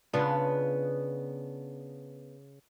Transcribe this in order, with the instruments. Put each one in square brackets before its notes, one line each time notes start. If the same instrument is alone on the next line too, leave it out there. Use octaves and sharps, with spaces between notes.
[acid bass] C#3 [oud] B3 D4 F4